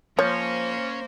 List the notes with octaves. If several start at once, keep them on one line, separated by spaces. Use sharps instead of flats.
F3 A#3 C#4 C5 C#5